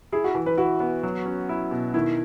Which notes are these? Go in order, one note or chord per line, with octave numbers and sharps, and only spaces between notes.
E4 G#4
F#4
E3
B4
E4 F#4
B3
F#3
C#4
E4
B2
D#3 E4